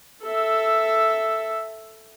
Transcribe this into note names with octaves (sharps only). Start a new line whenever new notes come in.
A4 E5